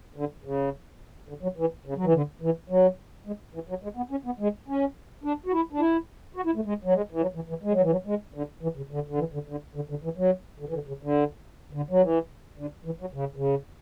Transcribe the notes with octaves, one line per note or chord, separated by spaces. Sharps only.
D3
C#3
D3
F#3
E3
C#3
F#3
E3
D3
E3
F#3
G#3
E3
F#3
G#3
B3
C#4
B3
G#3
C#4
D4
F#4
E4
D4
E4
F#4
E4
A3
G#3
F#3
G#3
E3
F#3
E3
E3
G#3
F#3
E3
F#3
G#3
D3
E3
C#3
D3
D3
E3
D3
D3
D3
D3
E3
F#3
D3
E3
D3
C#3
D3
D3
F#3
E3
D3
E3
F#3
C#3
C#3